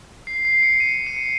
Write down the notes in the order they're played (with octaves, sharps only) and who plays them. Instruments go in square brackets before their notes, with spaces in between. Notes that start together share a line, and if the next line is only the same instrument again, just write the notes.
[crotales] C7
C7
C#7
D#7
D#7
C#7